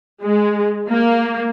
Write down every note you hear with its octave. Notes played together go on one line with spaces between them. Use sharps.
G#3
A#3